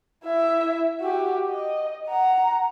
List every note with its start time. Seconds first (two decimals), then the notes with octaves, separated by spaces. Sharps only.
0.24 E4 E5
1.01 F#4 G4
1.48 D#5
2.08 F#5 A#5